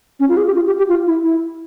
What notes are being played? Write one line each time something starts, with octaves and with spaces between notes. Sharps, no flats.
C#4
F4
G#4
G4
F4
G4
G4
F4
E4
E4